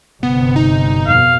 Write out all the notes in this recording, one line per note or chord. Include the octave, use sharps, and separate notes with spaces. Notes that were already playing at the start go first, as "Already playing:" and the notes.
G1 C3 B3
D#4
F2 B2 F5